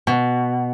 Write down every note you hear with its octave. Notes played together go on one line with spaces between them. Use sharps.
B2